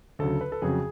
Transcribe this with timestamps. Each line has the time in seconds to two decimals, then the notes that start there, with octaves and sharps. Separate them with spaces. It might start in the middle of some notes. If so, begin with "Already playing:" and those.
0.19 D2 C#3 F#3 A4
0.41 B4
0.52 A4
0.62 F2 C#3 F#3 G#4